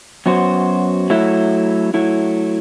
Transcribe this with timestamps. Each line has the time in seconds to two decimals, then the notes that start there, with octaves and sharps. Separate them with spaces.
0.26 F#2 F#3 B3 F#4 C5
1.10 F#3 A3 E4
1.94 F#3 A3 E4